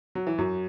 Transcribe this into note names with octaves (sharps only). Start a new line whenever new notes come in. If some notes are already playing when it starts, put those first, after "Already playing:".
F#3
E3
F#2 F#3